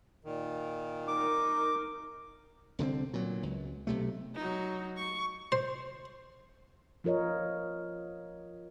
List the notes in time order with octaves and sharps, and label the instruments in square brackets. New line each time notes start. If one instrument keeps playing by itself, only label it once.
[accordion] A#2 D#3
[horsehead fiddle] D#4 A#4 [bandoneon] D6
[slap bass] C2 D3 G3 C4
A#2 F#3
C#2
B1 C3 A3
[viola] F#3 D#4
C#6
[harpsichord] C5
[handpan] F3 F4 A#4 C#5 D#5